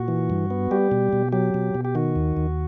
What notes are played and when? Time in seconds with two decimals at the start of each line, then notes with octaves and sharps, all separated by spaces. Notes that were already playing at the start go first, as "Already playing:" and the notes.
Already playing: A#2 F#4
0.08 E3
0.30 G2
0.50 B3
0.71 G3 G4
0.92 B2
1.13 B2
1.32 F#3 G4
1.54 B2
1.75 B2
1.85 G4
1.95 D#3 F#4
2.16 D#2
2.37 D#2